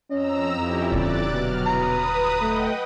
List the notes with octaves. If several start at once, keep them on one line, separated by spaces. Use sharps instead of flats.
F2 C#4 D#5 A#5 E6
F2 C#4 E4 G4
D#1 D3 D5 D6 F#6 A6
B2 F#3 F6
B4 A#5 D#6
A3 D#5 F#5 G5